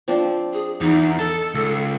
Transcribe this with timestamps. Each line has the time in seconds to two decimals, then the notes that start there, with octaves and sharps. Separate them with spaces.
0.08 F3 C4 D4
0.53 G#4
0.81 E2 D#4
1.19 D#4 A4 A5
1.54 C#2